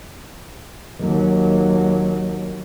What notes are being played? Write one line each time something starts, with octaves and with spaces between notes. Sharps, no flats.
D#2 F#3